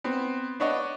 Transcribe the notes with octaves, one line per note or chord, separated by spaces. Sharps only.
B3 C4
D4 B4 C#5 D#5 F#5